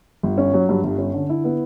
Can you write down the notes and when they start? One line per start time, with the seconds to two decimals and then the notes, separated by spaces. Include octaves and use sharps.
0.23 G1
0.38 C#4
0.54 F#3
0.69 G2
0.83 G1
0.98 C#4
1.14 D3
1.29 E4
1.44 B3